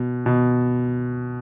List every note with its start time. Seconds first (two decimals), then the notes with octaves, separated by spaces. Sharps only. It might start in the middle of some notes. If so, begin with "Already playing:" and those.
Already playing: B2
0.26 B2